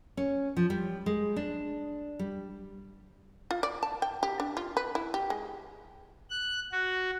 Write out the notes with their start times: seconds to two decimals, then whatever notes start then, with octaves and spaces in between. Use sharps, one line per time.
0.17 C#4
0.57 F3
0.70 G3
1.06 G#3
1.36 D4
2.19 G3
3.51 F4
3.63 D5
3.83 A5
4.02 G5
4.23 G4
4.40 D4
4.57 F4
4.77 B4
4.95 E4
5.14 G4
5.30 G#3
6.30 F#6
6.72 F#4